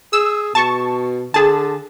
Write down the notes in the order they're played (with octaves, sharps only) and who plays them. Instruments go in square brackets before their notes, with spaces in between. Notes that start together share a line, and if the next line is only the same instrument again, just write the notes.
[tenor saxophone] G#4 [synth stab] E6
[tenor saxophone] B2 [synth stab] A5 C#6
[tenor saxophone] D3 [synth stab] G#4 A5